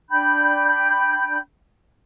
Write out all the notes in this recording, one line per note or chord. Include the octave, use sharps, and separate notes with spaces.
D4 G5 B5 G6